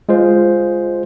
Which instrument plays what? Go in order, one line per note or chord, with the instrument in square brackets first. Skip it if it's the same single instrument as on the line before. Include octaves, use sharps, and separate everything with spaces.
[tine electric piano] G#3 F4 C5